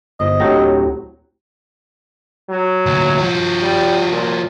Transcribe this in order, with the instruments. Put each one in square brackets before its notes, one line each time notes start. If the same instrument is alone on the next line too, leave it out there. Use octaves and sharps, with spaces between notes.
[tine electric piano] G1 [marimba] C5 [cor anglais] D#5
[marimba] D2 G4 A#6 [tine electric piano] A2 F#3 C4
[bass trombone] F#3
[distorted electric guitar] D2 A#2
F3 F#4
[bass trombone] G3
A#2